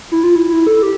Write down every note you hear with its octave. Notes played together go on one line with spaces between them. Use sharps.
E4
F4
E4
E4
A4
G4